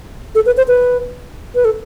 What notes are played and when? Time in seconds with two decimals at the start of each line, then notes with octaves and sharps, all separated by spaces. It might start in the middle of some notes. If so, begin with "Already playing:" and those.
0.35 A4
0.46 B4
0.57 C5
0.68 B4
1.55 B4
1.65 A4